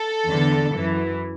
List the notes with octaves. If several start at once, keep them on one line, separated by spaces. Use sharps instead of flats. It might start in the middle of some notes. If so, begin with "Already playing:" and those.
Already playing: A4
E2 D3
F#2 E3